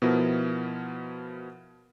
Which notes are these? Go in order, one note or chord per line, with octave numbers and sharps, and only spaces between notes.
B2 F3 B3 E4 A#4